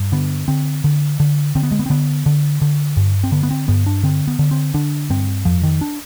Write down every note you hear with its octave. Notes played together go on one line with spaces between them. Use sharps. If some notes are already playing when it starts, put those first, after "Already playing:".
Already playing: G2
D3 B3
D3 C4
D3
D3
D3 C4
B3
G#3
B3
C4
D3 B3
D3
D3
G2
C4
D3 B3
B3
C4
G2 B3
D4
D3 C4
B3
D3
C4
D3 D4
G2 C4
F2 F3
D#3
D4